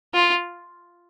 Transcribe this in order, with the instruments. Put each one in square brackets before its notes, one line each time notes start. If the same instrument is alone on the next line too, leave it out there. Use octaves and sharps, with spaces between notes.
[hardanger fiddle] F4